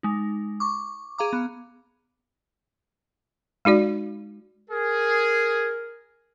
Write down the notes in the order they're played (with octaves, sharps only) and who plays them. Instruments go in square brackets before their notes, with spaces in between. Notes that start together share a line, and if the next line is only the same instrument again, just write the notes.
[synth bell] G#3 D#4
C#6 D6
G#4 F5 A#5 D6
B3
[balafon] G#3 D#4 F#4 D5
[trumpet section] G#4 [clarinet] A#4